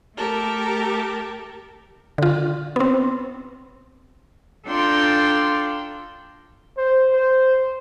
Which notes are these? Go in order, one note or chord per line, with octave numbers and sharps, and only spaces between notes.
A3 G4 A4 A#4
D3 F4
B3 C4
D4 F4 A4 G5 A#5 C6
C5
C5